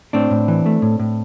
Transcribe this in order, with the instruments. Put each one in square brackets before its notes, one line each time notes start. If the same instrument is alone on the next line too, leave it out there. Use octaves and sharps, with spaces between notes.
[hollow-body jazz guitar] A2 C4 D4
A2
E3
A3
A2
A2